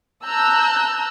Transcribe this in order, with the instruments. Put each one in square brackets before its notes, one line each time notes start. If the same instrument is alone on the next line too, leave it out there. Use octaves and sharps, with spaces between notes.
[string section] A5 A#5 E6 F#6 G6